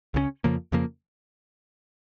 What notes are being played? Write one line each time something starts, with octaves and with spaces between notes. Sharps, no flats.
C#2 C#3 G#3 C#4
F2 C#3 F3 A#3
F2 C#3 F3 A#3